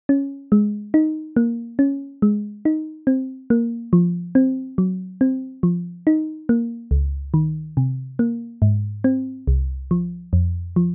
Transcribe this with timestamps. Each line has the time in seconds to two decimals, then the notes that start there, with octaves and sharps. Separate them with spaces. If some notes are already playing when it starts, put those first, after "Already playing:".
0.09 C#4
0.52 G#3
0.94 D#4
1.36 A#3
1.79 C#4
2.22 G#3
2.65 D#4
3.07 C4
3.50 A#3
3.93 F3
4.35 C4
4.78 F#3
5.21 C4
5.63 F3
6.07 D#4
6.49 A#3
6.91 C#2
7.34 D#3
7.77 C3
8.19 A#3
8.62 G#2
9.04 C4
9.47 C2
9.91 F3
10.33 F2
10.76 F3